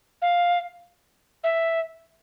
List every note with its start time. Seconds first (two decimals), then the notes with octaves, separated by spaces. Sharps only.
0.22 F5
1.44 E5